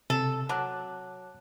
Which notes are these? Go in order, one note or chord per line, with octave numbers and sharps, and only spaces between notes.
C3 A4
F#3 A5 D6 F#6